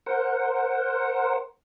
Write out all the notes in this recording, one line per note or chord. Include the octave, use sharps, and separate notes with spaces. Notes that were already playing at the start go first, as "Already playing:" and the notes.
A#4 C5 F#5